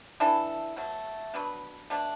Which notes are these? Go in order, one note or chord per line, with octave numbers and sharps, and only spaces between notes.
E3 D4 A4
B2 F#3 A3
B2 F#3 D4 B4
B2 A3 D4